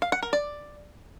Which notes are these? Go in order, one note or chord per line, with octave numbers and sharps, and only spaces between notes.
F5
F#5
A#4
D5